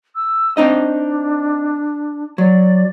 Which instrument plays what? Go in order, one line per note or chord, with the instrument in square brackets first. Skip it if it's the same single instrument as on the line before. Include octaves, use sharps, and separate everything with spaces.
[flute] E6
[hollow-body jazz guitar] C4 D#4 D#5 [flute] D4
[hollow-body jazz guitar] F#3 [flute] D5